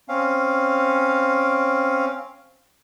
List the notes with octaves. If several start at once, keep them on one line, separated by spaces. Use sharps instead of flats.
C4 C#4 F5